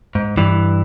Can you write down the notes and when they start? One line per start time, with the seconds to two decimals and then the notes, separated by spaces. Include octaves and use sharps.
0.15 G#2
0.37 G2 E3